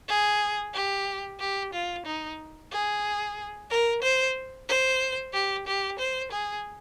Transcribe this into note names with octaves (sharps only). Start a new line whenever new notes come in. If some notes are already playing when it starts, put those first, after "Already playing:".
G#4
G4
G4
F4
D#4
G#4
A#4
C5
C5
G4
G4
C5
G#4